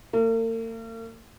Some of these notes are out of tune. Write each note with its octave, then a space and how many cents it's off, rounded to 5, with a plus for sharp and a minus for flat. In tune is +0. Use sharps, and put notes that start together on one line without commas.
A#3 -45